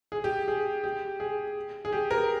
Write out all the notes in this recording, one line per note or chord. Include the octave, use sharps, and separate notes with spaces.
G#4
G4
G#4
G4
G#4
G#4
G4
A#4